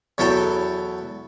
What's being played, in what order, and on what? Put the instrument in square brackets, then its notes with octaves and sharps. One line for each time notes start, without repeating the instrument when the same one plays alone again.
[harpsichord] E2 F#3 E4 A4 G5